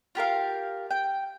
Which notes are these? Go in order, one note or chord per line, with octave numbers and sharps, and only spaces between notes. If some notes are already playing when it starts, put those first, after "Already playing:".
F4 G4 A#4 F5
G5